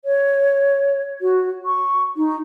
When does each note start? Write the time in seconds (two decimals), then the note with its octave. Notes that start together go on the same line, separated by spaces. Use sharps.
0.05 C#5
1.21 F#4
1.66 C#6
2.17 D#4